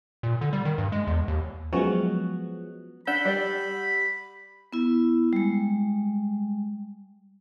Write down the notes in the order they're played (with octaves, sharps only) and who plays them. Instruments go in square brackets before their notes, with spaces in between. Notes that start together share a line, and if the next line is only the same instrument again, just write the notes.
[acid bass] A#2
D3
G3
D#3
G2
G#3
E2
D#2
[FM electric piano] F3 F#3 G#3 [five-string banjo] B3 C#4 F#4
[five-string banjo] D4 [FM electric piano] F#5 E6 G6 [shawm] B5
[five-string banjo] G3 D5
[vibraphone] B3 E4
G3 G#3